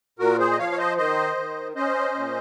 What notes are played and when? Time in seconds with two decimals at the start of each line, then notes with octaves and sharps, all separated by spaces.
0.19 A#2 F#4 A#4
0.39 G#4 C5
0.51 D#5
0.58 F3 C#5 F5
0.72 C#5
0.78 C5 D#5
0.97 D#3 C5 D#5
1.36 D#3
1.76 C#4 C5 D#5
2.15 A#2